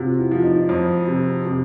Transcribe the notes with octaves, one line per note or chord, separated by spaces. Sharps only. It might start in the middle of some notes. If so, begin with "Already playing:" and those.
Already playing: C3 F4 F#4
E4
F3
D#4
F2
C3
C3